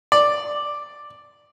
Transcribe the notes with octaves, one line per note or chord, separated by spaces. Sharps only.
D5